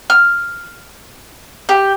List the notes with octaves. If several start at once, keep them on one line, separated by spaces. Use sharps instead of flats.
F6
G4